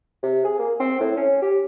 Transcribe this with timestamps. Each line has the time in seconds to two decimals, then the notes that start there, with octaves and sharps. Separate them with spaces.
0.23 C3
0.45 G#4
0.59 A#3
0.80 C4
1.00 A2
1.17 C#4
1.42 G4